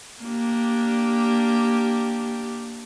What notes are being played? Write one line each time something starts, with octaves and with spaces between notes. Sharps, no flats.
A#3 D4 G4